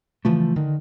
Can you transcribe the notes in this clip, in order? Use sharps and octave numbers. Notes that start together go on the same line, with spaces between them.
C#3 E3 F3 A3
D3 D#3